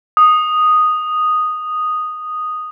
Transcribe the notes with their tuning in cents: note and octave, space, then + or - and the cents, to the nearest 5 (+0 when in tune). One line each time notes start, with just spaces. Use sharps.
D#6 -5